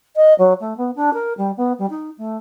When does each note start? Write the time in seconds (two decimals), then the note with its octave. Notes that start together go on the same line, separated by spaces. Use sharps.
0.16 D#5
0.39 F#3
0.60 A3
0.77 B3
0.95 D4
1.13 A#4
1.37 G3
1.57 B3
1.78 G3
1.90 D#4
2.18 A3